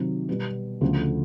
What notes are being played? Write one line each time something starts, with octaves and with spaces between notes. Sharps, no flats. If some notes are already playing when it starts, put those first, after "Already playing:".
Already playing: C3 D#3 F#3
B2 G3 B3
D2 C#3 F3 A3